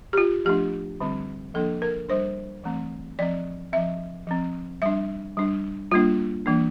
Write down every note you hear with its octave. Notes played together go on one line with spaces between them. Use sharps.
G4
F4
F3 A3 D4 G4
D3 G3 C4
F3 A#3 D4 A4
A#4
G3 D4 C5
E3 A3 C4
F3 C4 D5
F3 C4 E5
F3 C4
G3 D4 E5
G3 D4
G3 A#3 D4 F4
E3 A#3 D4